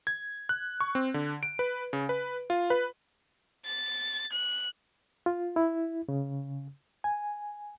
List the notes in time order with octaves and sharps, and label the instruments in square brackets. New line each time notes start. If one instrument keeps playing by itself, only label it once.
[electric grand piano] G#6
F#6
C#6
C4
D3
D7
B4
C#3
B4
F4
B4
[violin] A6
F#6
[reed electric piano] F4
E4
C#3
G#5